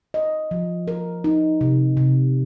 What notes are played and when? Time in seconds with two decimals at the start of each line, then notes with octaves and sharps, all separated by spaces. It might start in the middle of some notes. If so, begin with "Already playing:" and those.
0.14 D#5
0.51 F3
0.88 A#4
1.24 D#4
1.61 C3
1.97 C3